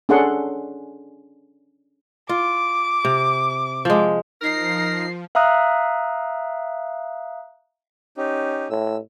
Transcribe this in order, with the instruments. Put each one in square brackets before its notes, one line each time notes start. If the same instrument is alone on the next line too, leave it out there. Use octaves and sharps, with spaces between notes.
[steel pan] C#4 D4 G#4 A4 F#5 C6
[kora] F4 [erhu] D6
[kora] C3
F3 G#3
[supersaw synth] F3 [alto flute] D#4 [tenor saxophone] A#4 [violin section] C7
[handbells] E5 F5 A#5 D#6 F#6
[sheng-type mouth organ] C#4 D#4 G4
[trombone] A2 [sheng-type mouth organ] E6